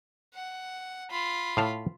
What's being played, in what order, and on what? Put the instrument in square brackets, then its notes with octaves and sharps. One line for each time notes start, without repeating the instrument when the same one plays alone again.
[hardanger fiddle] F#5
F4 B5
[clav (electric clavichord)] A2 F5 A5